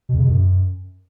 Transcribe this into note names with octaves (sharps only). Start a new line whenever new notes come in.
B2
F2
C#3
B2
F#2